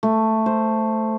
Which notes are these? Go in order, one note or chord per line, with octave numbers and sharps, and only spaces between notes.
A3
C5